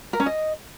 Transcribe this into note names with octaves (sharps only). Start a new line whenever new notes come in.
A#4
C#4
D#5